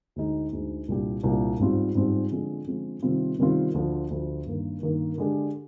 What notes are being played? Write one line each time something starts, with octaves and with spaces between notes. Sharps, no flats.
D2 D3 G#3 D#4
D2 D3 G#3 D#4
C2 A#2 G3 D4 G4
C2 A#2 G3 D4 G4
G#2 G3 C4 F4
G#2 G3 C4 F4
D3 F3 G#3 C4
D3 F3 G#3 C4
C3 D#3 G3 C4 F4
C3 D#3 G3 C4 F4
D2 D3 F3
D2 D3 F3
G2 D#3 A#3
G2 D#3 A#3
D3 G#3 D4 G4